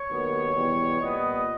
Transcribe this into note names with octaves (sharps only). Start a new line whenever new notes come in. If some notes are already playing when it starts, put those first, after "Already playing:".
Already playing: C#5
D#2 D#3 F#3 B3
E2 B2 G3 B3
A#2 G3 B3 D#5